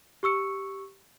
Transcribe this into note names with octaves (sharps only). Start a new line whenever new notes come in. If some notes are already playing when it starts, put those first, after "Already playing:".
G4 C#6 E6 C#7